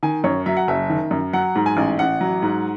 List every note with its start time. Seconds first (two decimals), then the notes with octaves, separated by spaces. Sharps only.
0.03 D#3 G#5
0.24 F#2 C#5
0.46 F#3 E5
0.57 F#5
0.68 F#1 E5
0.90 D#3
1.11 F#2
1.33 F#3 F#5
1.56 G#2
1.66 G#5
1.77 A1
1.99 A1 F#5
2.21 F#3
2.43 G#2